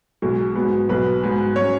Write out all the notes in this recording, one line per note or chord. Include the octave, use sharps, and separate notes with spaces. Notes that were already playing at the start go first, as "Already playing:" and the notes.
B1 B2 G#3
G#2 F#3 B3
B1 B2 B3 B4
G#2 F#3 B3
F#3 C#4 C#5